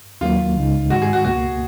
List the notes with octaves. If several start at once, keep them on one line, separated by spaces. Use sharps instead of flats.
D#2 D#3 F#3 A#3 F4
C#2 C#3 G#3 D#4
G#2 D#3 G#3 F#4
G#4
F#4
C#2 B2 A#3 F#4